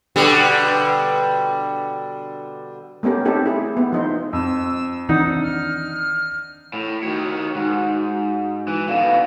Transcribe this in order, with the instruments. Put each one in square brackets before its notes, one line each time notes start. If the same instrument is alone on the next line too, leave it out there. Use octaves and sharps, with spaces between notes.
[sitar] B2 D3 G3
[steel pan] A3 B3 C#4 G4 A#4
C4 D#4 F#4 G4 A4
E4 G#4
B3
F3 D#4 C5
[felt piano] F2 [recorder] E6
[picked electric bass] D#3 E3 C4 [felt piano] D4 [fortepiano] D#4 [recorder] F#5
[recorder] F6
[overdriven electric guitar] A2
[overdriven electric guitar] D#3 C#5 [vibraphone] F#4
[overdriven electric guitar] G#2
[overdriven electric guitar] E3 [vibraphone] F#4
[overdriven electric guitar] B2 D3 [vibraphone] F5